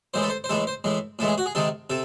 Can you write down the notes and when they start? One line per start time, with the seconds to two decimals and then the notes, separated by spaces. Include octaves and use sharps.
0.14 A2 E3 G#3 C5
0.23 A4
0.30 C5
0.44 C5
0.49 A2 E3 G#3 A4
0.67 C5
0.84 A2 E3 G#3
1.19 A2 E3 G#3 A4
1.28 G#4
1.38 F#4
1.46 G#4
1.55 C3 D#3 G#3 A4
1.90 C3 A4